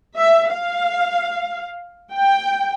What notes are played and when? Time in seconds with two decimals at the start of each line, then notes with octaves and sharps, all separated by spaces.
0.18 E5
0.52 F5
2.14 G5